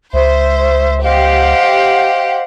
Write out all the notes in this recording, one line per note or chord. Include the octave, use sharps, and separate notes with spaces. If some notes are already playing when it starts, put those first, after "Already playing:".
C#2 C5 E5
G4 C5 D#5 F5 F#5